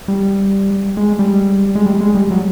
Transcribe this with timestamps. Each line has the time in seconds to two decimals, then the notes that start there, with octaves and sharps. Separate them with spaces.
0.08 G3
0.97 G#3
1.19 G3
1.75 G#3
1.86 G3
2.01 G#3
2.15 G3
2.31 F#3